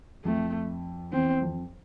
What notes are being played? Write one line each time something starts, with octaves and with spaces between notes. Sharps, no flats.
F2 A3
E2 C4
F2